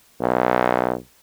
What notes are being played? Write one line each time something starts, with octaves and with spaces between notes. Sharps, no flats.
B1